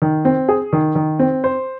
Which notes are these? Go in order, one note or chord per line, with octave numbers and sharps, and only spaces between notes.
D#3
C4
G#4
D#3
D#3
C4
C5